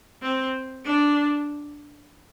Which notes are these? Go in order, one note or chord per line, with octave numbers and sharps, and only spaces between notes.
C4
D4